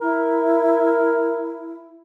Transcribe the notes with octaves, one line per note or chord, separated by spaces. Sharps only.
E4 A#4